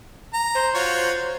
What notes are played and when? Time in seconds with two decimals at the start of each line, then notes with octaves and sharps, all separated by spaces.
0.34 A#5
0.55 C5
0.74 F4 F#4 C#5